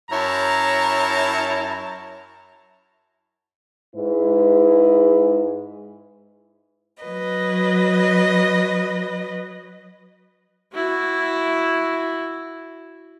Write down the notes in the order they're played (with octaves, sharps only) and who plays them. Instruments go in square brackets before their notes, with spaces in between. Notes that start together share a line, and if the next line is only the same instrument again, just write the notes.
[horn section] F#2 E4 C#5 A5 A#5
[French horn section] G#2 G#3 E4 B4
[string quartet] F#3 B4 D#5
[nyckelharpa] E4 F#4